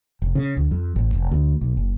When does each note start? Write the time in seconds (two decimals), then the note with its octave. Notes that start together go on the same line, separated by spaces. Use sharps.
0.22 F1
0.35 C#3
0.57 D2
0.71 F2
0.96 A1
1.14 F1
1.31 D2
1.61 B1
1.77 F#1